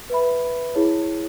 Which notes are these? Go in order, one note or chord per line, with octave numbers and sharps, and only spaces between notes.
B4 E5 B5
E4 G#4 C#5